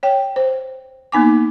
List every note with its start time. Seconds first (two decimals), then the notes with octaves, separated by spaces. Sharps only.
0.03 C#5 G5
0.36 C5
1.12 A#3 B3 D#4 G#5 D6